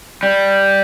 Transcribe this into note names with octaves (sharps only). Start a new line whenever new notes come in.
G3